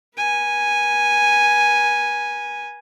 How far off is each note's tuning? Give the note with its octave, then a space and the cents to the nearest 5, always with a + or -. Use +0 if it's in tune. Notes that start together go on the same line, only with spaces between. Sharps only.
B4 -40 G#5 -5